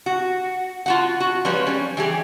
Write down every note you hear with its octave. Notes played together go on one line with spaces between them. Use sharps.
F#4
F4 F#4 F#5
F#4
F3 G3 G#3 B4 C#5
G3 C#4
E3 G4 G#4